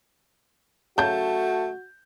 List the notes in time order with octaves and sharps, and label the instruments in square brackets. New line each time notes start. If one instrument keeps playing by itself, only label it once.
[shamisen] C#3 F#3 [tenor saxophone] A3 [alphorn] F#4 [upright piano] A5 G6